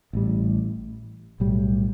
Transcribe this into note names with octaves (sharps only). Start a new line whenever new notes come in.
A1 A2 G3
B1 A2 G3